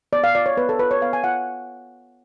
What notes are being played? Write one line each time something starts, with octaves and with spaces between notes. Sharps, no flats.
B3 D5
F5
F4 D5
C#5
B3 B4
A4
F4 B4
C#5
B3 F5
G#5
F4 F#5